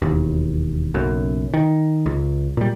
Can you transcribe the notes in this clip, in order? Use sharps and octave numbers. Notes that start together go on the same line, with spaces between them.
E1 D#2
F#1 B1 F#2
D#3
C#2
A#2 G3